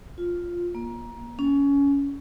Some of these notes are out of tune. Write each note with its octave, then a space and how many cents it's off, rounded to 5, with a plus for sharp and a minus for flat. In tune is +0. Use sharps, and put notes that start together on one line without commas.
F4 +0
A#3 +20
C#4 +20